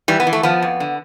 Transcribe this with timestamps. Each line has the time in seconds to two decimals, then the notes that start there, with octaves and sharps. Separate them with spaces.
0.08 E3 G3
0.20 B3
0.27 E3
0.33 A3
0.43 F3 B3
0.62 F2
0.80 D3